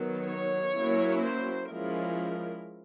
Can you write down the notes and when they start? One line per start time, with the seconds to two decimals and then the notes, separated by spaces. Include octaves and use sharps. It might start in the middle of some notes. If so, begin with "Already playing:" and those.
Already playing: D#3 F#3 B3
0.28 C#5
0.75 F#3 A#3 C#4 E4
1.22 C5
1.69 F3 G#3 C#4 E4 A#4